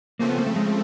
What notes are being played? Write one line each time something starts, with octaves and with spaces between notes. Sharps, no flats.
C#3 F3 A3 A#3 C4
B3
A#3
A3
G#3